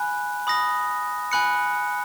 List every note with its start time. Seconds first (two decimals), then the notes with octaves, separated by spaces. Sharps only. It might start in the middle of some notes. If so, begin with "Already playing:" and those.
Already playing: G#5 B5 F#6
0.47 B5 D#6 A#6
1.32 G#5 B5 F#6 C#7